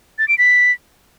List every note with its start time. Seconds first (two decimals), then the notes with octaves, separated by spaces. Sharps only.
0.19 A6
0.28 D7
0.38 B6